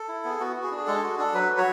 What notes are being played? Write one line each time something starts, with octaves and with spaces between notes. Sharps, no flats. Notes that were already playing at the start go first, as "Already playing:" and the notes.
Already playing: A4
E4
B3 G#4
B3 F#4
F#4
G#4
D4
G#4
G#3 A4
F#4 G#4
D4 A4
F#3 B4
F#4
C#5